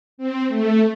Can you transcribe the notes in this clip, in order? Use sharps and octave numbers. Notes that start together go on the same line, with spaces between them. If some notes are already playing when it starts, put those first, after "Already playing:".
C4
A3